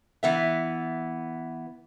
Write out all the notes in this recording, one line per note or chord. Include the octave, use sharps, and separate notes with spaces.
E3 B3 E5